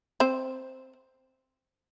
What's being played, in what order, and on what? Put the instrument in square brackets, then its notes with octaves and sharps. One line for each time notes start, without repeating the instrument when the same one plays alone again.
[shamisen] C4 C5